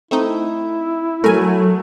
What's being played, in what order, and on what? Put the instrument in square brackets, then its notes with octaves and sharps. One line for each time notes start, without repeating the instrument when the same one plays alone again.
[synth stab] A3 C4 D#4 [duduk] E4
[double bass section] F#3 [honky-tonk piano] A3 [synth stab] A#4 G#5